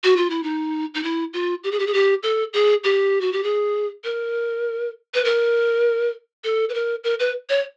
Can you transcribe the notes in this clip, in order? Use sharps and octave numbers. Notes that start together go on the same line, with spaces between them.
F#4
F4
E4
D#4
D#4
E4
F4
G4
G#4
G4
G#4
G4
A4
G#4
G4
F#4
G4
G#4
A#4
B4
A#4
A4
B4
A#4
A#4
B4
C#5